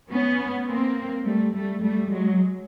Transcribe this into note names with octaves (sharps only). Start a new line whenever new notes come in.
B3 C#4
A#3 C4
G3 A3
G3 A3
G3 A3
F#3 G#3